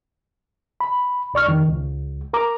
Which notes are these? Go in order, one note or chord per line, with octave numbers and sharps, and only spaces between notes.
B5
C2 D5 C#6 F6
F2 D#3
C#2
A#4 A#5 D6